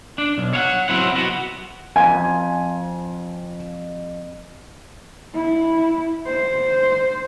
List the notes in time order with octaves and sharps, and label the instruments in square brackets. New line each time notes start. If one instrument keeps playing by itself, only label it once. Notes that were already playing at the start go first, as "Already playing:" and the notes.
[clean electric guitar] D4
B1
C#5 F5 F#5
F#3 C4 E4 F#5
B3 F#4
[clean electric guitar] F2 [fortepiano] G#5
[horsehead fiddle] E4
C5